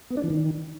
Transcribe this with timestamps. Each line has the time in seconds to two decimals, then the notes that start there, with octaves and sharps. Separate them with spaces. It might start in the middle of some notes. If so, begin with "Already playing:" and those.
0.10 B3
0.17 D4
0.23 E3
0.30 D#3